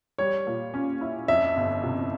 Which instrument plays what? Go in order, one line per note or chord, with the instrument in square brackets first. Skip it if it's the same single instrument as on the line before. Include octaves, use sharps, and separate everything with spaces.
[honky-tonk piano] G3 [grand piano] C#5
[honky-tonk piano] A#2
C#4
E4
[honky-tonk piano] F2 [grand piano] E5
[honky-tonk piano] G1
C3